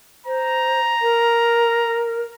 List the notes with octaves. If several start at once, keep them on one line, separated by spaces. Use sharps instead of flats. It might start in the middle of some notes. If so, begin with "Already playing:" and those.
C5 A#5
A#4